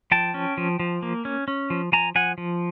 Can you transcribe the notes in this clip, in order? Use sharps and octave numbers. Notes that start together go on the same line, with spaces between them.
F3 G5 A5
C#4
F3
F3
A#3
C#4
C#4
F3
F3 G#5 A#5
F3 F#5 G#5
F3